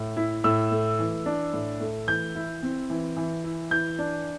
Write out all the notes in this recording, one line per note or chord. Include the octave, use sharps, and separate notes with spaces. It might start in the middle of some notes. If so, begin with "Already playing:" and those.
Already playing: A2
E4
A2 E6
A3
E3
D4
A2
A3
E3 G6
E4
C4
E3
E3
E4
E3 G6
D4